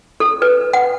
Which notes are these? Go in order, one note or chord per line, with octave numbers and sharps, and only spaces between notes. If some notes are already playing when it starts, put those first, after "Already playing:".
A4
B4
F#5